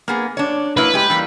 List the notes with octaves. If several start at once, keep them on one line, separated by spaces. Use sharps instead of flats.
A#3 B3 G#4
D4 C#5
F#3 A#3 E4 B4
G#3 G4
E3 G3 A#3